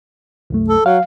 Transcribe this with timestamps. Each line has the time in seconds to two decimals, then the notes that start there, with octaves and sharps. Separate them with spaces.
0.50 C2 F#2 A3
0.69 A4
0.86 F#3 F5